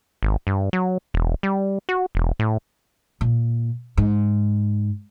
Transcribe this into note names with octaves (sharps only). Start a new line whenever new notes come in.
G#1
G2
F#3
E1
G3
F#4
E1
A2
A#2
G#2